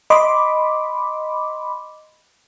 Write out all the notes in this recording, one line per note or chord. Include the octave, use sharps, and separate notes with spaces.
D#5 B5 C6 D6